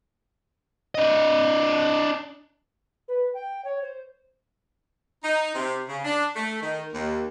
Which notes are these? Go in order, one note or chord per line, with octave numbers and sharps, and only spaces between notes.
D4 D#5
B4
G5
C#5
C5
D#4
C3
C#3
D4
A3
D#3
D#2